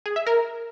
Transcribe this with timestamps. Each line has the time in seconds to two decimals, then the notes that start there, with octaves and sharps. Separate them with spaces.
0.06 G#4
0.16 E5
0.27 A#4